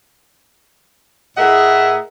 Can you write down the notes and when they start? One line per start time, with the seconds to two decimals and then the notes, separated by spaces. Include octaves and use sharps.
1.38 A2 G#4 A#4 D#5 E5 F#5